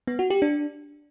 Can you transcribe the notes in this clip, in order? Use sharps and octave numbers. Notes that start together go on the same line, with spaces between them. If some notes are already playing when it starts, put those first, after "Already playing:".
B3
F#4
G4
D4